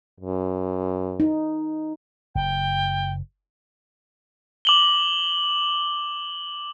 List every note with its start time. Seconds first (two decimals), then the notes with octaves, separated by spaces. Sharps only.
0.20 F#2
1.20 D#4
2.35 F#1 G5
4.65 D6 F#7 G7